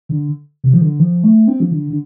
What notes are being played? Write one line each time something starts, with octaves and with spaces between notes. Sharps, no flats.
D3
C3
F3
D3
F3
A3
C4
F3
D3
D3